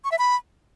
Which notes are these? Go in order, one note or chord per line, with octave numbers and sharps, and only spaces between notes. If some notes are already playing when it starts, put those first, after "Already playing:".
C#6
E5
B5